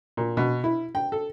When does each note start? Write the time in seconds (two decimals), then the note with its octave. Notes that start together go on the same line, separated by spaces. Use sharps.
0.17 A#2
0.37 B2
0.64 E4
0.95 G5
1.12 A4